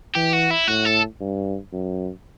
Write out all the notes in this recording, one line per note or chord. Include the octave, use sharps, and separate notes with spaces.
E3 G4
F#4
E4
A2 F#4
A4
G2
F#2